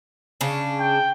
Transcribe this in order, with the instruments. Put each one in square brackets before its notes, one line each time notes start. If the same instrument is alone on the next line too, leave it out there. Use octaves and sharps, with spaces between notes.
[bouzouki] C#3 C#4 D4
[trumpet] G5